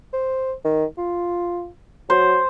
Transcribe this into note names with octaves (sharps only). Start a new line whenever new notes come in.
C5
D#3
F4
F#3 C5